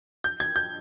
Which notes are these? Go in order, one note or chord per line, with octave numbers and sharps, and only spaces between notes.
G6
G#6
G6